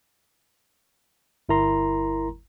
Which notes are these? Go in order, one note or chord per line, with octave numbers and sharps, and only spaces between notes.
G1 E4 A#4 A#5 C6